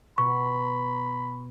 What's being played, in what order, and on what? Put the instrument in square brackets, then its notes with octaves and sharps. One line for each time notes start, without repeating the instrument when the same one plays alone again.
[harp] B2 [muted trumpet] B5 [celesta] C#6